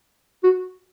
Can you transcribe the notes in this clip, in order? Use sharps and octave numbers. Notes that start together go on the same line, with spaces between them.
F#4